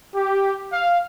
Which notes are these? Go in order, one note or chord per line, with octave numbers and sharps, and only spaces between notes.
G4
F5